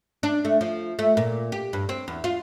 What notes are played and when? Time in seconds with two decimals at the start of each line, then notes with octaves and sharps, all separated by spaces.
0.23 D4
0.45 A3
0.61 F3
0.99 A3
1.17 A#2
1.52 G4
1.73 G2
1.89 C4
2.08 E2
2.24 F4